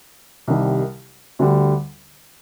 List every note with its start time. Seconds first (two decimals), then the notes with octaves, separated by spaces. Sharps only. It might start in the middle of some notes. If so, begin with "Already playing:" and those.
0.47 C2 C3 D#3 G3
1.39 D2 D3 G3